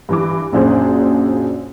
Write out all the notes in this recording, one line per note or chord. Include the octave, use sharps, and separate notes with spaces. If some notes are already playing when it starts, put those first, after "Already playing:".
G2 E3 D6
A#1 F#2 F#3 D4 G#4 C5